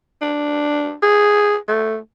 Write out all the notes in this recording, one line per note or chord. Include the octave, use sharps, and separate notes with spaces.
D4
G#4
A3